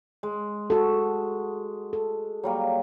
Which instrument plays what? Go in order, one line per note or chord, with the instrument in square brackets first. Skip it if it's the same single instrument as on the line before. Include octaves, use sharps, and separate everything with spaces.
[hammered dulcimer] G#3
[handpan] F#4 A4
A4
[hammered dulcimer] F#3 G3 A#3